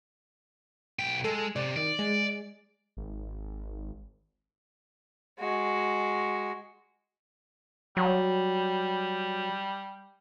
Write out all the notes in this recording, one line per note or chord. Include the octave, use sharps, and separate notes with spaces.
B1 G5 B6
G#3 A4
C3 D5
D#3 D5
G#3
G#1
G#3 F#4
F#3 G3